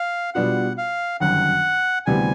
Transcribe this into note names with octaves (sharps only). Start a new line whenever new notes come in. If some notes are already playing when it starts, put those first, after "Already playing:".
Already playing: F5
B2 G3 B3 D4 F4 F#5
F5
G1 F#2 D#3 F#5
D2 C3 E3 G3 B3 G#5